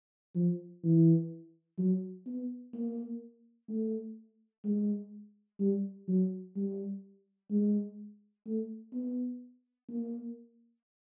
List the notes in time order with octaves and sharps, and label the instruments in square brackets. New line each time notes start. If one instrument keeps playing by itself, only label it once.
[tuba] F3
E3
F#3
B3
A#3
A3
G#3
G3
F#3
G3
G#3
A3
B3
A#3